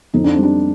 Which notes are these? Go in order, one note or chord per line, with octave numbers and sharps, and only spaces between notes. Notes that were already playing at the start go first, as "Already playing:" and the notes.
F2 D#4
D4
G3 C4
D4